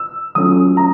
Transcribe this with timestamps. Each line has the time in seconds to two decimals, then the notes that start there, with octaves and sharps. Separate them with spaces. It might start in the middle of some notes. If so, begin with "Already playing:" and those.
Already playing: E6
0.35 F#3 A3 C#4 F4 D#6
0.77 A#5